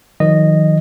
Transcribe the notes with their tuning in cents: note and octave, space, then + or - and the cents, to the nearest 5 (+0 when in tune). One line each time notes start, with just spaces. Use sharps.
D#3 +20 F#3 -35 D#5 -10